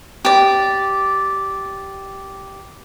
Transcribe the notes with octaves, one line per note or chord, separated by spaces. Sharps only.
G4 D5